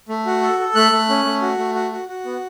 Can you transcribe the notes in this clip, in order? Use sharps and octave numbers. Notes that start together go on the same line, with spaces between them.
A3
F#4
A4
A4
A3 F#6
A3
C#4
A3
F#4
A3
F#4
F#4
F#4
B3